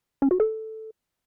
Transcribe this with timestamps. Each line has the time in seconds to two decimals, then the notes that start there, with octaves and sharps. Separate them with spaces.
0.22 C#4
0.31 F#4
0.40 A4